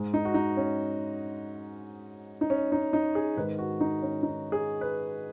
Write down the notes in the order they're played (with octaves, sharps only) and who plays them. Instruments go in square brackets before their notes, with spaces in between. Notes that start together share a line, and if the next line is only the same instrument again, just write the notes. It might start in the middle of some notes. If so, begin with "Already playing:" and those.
Already playing: [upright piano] G#2 G#3
D#4
F#4
D#4
C#4
D#4
C#4
D#4
D#4
G#4
G#2 D#3 G#3 B4
F#4
D#4
C#4
D#4
G#4
B4